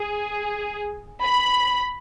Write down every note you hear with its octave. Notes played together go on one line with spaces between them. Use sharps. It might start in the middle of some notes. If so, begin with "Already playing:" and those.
Already playing: G#4
B5